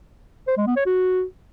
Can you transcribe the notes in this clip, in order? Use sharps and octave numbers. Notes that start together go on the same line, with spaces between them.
C5
G#3
B3
C#5
F#4